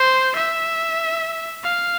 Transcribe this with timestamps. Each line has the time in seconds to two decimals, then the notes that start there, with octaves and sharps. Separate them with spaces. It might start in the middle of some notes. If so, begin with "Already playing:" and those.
Already playing: C5
0.35 E5
1.63 F5